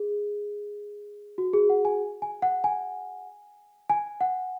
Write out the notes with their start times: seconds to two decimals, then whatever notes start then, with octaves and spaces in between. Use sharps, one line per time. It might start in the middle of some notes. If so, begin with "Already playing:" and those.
Already playing: G#4
1.38 F#4
1.53 G#4
1.70 F#5
1.85 G#5
2.22 G#5
2.42 F#5
2.64 G#5
3.90 G#5
4.21 F#5